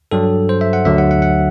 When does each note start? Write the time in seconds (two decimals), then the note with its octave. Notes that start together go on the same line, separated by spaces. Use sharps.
0.11 G2 F#3 A4
0.49 C5
0.61 E5
0.73 F#5
0.85 D2 D3 F#3 E5
0.98 F#5
1.11 F#5
1.22 F#5